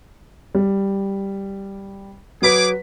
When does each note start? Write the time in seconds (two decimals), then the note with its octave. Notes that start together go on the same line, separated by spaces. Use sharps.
0.55 G3
2.42 F#3 G#4 B4 D6 B6